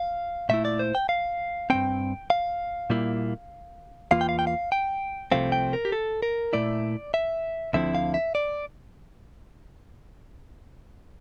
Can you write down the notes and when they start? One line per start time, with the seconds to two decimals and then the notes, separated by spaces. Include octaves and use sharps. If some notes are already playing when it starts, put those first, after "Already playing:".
Already playing: F5
0.49 A#2 A3 E4 E5
0.65 D5
0.79 C5
0.95 G5
1.09 F5
1.70 G2 F3 C4 G5
2.30 F5
2.90 A#2 G3 A#3 E4
4.11 E2 E3 A#3 F4 F5
4.21 G5
4.29 F5
4.39 G5
4.47 F5
4.72 G5
5.32 C2 C3 F3 A3 C4 F5
5.52 G5
5.73 A#4
5.85 G4
5.92 A4
6.23 A#4
6.53 A#2 A3 E4 D5
7.14 E5
7.73 D2 D3 F3 C4 E4 E5
7.95 F5
8.14 E5
8.35 D5